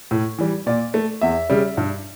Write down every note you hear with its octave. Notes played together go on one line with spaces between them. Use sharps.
A2
E3 G3
A#2 D5
A3
E2 E5
C#3 G3
G2